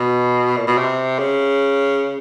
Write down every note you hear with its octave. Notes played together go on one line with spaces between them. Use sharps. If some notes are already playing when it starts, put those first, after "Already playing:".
Already playing: B2
A#2
B2
C3
C#3